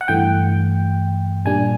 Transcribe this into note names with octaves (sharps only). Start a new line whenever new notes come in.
F#5
G2 E3 A3 G5
A#2 G3 A#3 D4 G#5